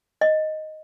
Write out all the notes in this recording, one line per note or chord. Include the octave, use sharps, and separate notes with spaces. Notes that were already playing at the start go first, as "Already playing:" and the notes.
D#5